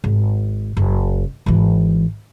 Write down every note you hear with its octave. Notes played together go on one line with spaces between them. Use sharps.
G#1
F#1
G#1 E3